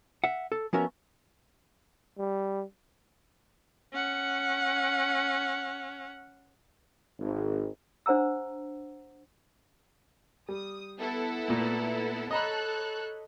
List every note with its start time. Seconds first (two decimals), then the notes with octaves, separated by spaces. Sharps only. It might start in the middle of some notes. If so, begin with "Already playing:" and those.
0.24 E5 F#5
0.52 A4
0.73 F3 B3 C#4 F#4 A#4 E5
2.18 G3
3.93 C#4 F#5
7.19 G#1
8.06 D4 C5 F#5 A#5 E6
10.49 G3 D#6
10.98 B3 E4 A4
11.48 A#2 A3
12.31 A4 C#5 D#5 A#5 B5 F#6